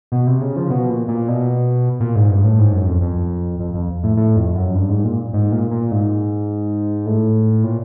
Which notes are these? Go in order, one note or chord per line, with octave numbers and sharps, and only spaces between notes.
B2
C3
C#3
F3
B2
A#2
A#2
B2
A#2
G#2
G2
A2
G#2
F#2
F2
F2
F2
F2
A2
A2
F2
F#2
G2
G#2
A#2
G#2
A#2
A#2
G#2
A2
A#2